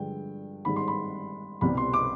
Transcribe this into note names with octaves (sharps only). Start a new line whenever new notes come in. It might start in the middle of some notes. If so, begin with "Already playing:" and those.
Already playing: G2 D3 F3 G#3 G5
G#2 D#3 G3 B5
C6
B5
C2 B2 G3 B5
C6
D6